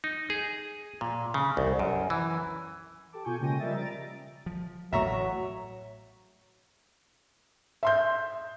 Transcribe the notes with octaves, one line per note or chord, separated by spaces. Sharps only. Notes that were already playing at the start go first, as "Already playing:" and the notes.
D#4
G#4
A#2
C#3
C2
F#2
E3
G4 A4 A5 D6
B2 F4 G#5 C#6 G6
C#3 G#3 A#3 G5 A#6 D#7
F3 G3 A#4 D#5 E5 A6
A#5 A6 D7
F3
A1 A2 F#3 A3 E5 A#5 C#6
E5 C6 G6